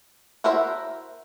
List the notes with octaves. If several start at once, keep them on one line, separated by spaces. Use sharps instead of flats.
E4 F#4 A#4 C5 E5